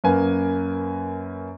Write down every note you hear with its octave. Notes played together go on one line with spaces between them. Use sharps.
F#2 A#3 B4 G#5